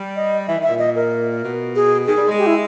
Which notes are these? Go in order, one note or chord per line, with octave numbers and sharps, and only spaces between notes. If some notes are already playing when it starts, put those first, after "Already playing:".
Already playing: G3
D#5
E3 E5
D#3 E5
A#2
D#5
A#4
B2
G#4
D#3 G#4
G3
G#3
G4
E4